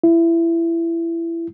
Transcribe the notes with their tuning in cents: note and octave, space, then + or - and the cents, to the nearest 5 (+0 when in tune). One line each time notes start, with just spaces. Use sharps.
E4 +20